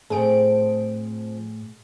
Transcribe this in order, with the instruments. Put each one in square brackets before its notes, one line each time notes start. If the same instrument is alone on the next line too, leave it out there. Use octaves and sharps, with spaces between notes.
[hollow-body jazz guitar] A2 [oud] F3 C4 C#5 [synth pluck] G#4 D7